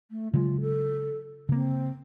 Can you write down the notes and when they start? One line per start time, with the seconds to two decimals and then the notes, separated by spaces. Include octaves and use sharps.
0.11 A3
0.34 C#3 F#3 G#3 F4
0.61 A4
1.49 C#3 A#3 C4